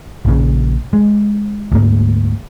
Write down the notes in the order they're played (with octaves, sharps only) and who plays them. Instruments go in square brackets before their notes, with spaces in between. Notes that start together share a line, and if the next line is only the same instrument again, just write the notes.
[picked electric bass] A#1 A#2 C#3
G#3
D2 G#2 A#3